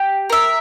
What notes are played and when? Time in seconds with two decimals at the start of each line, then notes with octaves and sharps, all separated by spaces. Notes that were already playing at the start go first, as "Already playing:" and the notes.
Already playing: G4
0.30 A#4 E5